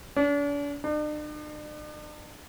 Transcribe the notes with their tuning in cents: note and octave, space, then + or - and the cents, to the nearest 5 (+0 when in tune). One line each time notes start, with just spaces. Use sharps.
D4 -40
D4 +45